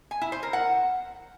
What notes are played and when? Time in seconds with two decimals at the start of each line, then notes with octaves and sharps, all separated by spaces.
0.11 G#5
0.22 E4
0.32 C5
0.43 A#4
0.53 F#5